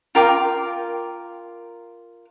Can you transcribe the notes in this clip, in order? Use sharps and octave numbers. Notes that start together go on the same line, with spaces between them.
F4 A#4 G5 D6